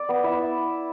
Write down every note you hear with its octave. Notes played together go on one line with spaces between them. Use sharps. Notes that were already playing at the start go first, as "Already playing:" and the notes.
Already playing: D5
B3
E4 E5